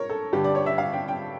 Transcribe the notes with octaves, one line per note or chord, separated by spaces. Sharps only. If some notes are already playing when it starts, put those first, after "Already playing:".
Already playing: A#4 C#5
A4
G2 D3 G4
D5
C#5
E5
F5
G5
G5